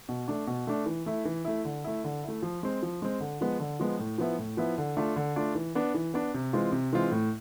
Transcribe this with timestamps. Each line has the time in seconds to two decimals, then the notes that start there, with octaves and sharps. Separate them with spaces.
0.09 B2
0.28 A3 D4
0.47 B2
0.67 A3 D4
0.86 E3
1.06 A3 E4
1.25 E3
1.45 A3 E4
1.65 D3
1.84 A3 E4
2.04 D3
2.23 E4
2.28 A3
2.43 F3
2.63 G#3 C4
2.82 F3
3.02 G#3 C4
3.20 D3
3.41 F3 G#3 B3
3.60 D3
3.80 F3 G#3 B3
3.99 A2
4.18 F3 B3 E4
4.38 A2
4.57 F3 B3 E4
4.78 D3
4.97 A3 D4 F4
5.16 D3
5.36 A3 D4 F4
5.55 E3
5.75 B3 D4
5.94 E3
6.14 B3 D4
6.34 C3
6.53 E3 G#3 C4 F4
6.72 C3
6.93 E3 G#3 C4 F4
7.12 A2